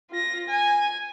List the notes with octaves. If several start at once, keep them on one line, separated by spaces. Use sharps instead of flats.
F4 A#6
G#5